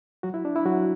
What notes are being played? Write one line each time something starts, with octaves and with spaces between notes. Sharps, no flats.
F#3 F#4
E4
D4
E4
F#3 F#4